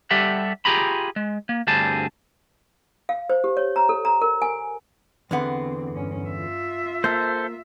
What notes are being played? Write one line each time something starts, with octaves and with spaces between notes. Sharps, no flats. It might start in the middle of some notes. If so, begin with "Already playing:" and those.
G3 G4 A4 E5 F#5
F4 G4 G#4 A#5 B5
G#3
A#3
D2 G2 G3 C4 G#4 A5
F5
C5
G4
C#5
A#5
A4
A#5
A#4
G#5
E2 D3 B3 C4
G2 C#4
F4 E5
A#3 A4 C5